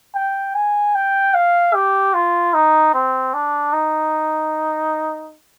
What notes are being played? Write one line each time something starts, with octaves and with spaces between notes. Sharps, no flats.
G5
G#5
G5
F5
G4
F4
D#4
C4
D4
D#4